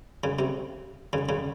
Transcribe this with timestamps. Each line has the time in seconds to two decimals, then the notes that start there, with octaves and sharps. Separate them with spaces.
0.24 C#3
0.39 C3
1.13 C#3
1.29 C#3